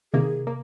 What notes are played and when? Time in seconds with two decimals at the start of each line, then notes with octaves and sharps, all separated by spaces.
0.13 C3 D#3 A#3 G#4
0.47 A#3